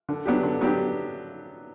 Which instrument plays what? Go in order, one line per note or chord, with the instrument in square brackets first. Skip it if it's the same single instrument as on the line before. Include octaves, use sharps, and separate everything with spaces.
[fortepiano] D3
F#3 B3 D4 G4
D3
F#3 B3 D4 G4